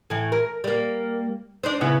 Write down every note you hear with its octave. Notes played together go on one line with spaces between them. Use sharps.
A2 E3
A#4
G3 A#3
D4 D#4 C5
C#3 B3 E4